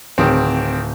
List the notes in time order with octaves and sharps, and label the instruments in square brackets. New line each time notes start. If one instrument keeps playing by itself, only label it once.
[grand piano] D1 [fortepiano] D#3 C4